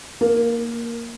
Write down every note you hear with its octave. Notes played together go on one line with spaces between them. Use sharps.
A#3